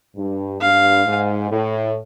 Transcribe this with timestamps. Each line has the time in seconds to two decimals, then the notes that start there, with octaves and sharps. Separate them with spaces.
0.16 G2
0.60 G2 F5
1.05 G#2
1.50 A2